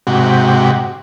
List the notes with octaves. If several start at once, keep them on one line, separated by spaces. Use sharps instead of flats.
G#2 C3 F#4 G4